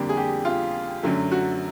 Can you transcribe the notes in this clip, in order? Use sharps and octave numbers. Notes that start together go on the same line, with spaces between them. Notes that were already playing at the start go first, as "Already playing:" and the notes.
Already playing: F2 D3 G3 A#3
G#4
G4
F4
F#2 D3 F#3 A3
F#4